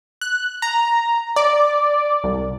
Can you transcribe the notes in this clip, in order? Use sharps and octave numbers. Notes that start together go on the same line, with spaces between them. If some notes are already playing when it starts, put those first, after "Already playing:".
F#6
A#5
D5
C2